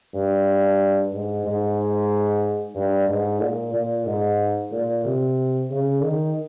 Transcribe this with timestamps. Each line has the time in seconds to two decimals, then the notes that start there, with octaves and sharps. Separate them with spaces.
0.14 G2
1.13 G#2
1.45 G#2
2.75 G2
3.08 G#2
3.41 A#2
3.74 A#2
4.07 G#2
4.72 A#2
5.05 C3
5.71 C#3
6.03 D#3